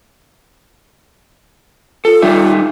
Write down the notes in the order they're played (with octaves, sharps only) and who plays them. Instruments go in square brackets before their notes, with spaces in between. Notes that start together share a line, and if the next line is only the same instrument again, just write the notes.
[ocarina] F4 [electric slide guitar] A4
[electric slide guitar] G3 D#4 E5